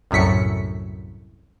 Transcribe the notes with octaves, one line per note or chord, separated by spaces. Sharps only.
C2 F#2 A2 B6 C#7